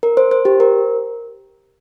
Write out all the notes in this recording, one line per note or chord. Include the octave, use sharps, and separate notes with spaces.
A#4
C5
C5
G4
A#4